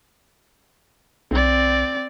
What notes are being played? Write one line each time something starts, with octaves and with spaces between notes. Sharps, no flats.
B1 C4 D5